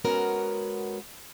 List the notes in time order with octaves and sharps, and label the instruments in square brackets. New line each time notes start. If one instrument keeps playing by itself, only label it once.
[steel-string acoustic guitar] G#3 B3 C#4 F#4 A#4